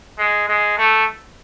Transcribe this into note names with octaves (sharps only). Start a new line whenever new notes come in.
G#3
G#3
A3